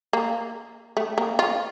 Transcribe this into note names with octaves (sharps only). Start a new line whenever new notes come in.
A#3
A3
A#3
F4